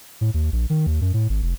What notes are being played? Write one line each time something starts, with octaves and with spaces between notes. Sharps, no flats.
A2
D#2
A#1
D#3
D#2
F#2
A2
G#1
F1